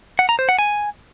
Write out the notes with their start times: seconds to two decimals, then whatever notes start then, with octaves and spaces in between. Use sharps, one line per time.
0.19 F#5
0.29 A#5
0.39 C5
0.49 F#5
0.59 G#5